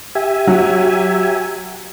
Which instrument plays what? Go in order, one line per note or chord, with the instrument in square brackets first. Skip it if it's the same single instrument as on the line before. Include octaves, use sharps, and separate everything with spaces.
[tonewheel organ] G4 E5 G#5
[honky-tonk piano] F#3